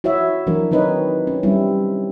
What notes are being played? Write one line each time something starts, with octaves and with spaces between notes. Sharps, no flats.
E4 F#4 C#5 E5
E3 F#3 D4 A#4
D#3 C4 D#4 B4 C#5 D#5
C#4
G3 C4 D4 E4